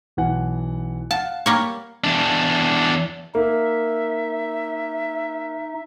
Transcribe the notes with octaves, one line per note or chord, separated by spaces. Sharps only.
B1 E3 F#5
F5 F#5 A5
G3 A#3 C#5
E2 D4
A#3 D#4 E5